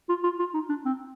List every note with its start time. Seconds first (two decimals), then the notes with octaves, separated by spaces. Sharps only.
0.09 F4
0.24 F4
0.39 F4
0.54 D#4
0.69 D4
0.85 C4